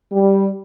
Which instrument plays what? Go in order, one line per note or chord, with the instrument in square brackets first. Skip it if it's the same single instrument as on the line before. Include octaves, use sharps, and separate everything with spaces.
[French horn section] G3